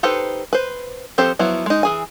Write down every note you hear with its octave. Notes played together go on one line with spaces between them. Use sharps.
D#4 G4 A4 B4 C5
B4 C5
F3 C4 G4 A4 C5
F3 F#3 B3 E4
G#3 D#4
E3 G#4 G#5